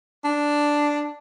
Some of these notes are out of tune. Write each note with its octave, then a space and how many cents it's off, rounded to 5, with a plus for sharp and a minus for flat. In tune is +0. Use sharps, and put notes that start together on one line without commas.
D4 +0